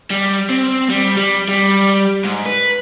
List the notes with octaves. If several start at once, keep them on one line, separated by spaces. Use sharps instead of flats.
G3
C4
G3
G3
G3
G#2
B4